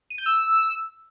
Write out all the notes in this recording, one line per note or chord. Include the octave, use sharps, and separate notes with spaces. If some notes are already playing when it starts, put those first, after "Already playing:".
D#7
G6
E6